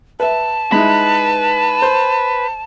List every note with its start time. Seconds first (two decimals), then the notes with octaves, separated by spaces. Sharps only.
0.20 B4 E5 A5
0.72 G#3 D#4 E4 B4
1.82 C5